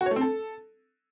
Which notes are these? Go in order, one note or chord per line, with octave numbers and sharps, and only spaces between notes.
F#4
C#5
A3
C4
A4